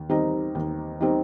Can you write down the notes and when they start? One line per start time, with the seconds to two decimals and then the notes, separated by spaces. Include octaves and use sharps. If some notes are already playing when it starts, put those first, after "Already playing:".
Already playing: D#2
0.09 D#3 G3 C4 D#4
0.55 D#2
1.01 D#3 G3 C4 D#4